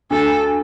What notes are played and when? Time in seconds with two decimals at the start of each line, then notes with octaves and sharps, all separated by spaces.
0.10 D2 A4